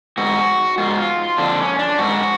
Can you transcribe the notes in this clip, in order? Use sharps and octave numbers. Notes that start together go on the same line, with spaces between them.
G#2 F#4
G#2 F4
F2 D3 D4
C#4
D4
G#2 F#4